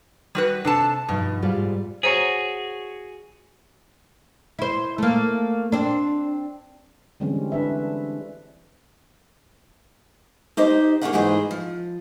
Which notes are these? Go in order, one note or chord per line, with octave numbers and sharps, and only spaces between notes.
G3 F#4 B4
C3 D4 A4 A5
G2 B2 F3 D#4
G#2 G3 F4
F#4 G#4 C5 C#5 A#5
E4 C5
A3 A#3
C4 D4
D3 E3 G3 G#3 C4 C#4
D4 B4 E5
D#4 G4 C5 D#5
A#3 C#4 E4 F4 F5 F#5
G#2 E3 A3 D#4 G#4 C5
F3